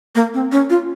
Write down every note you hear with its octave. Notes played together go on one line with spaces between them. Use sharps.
A#3
C4
C#4
F4